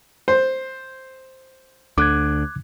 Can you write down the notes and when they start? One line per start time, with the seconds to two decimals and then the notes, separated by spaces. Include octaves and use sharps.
0.28 C5
1.98 D2 D3 D6 F#6 G#6